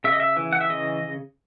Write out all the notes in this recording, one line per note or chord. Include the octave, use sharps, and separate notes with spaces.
C#3 E5
D#5
E5
E3
F#5
E5
C#3 D#5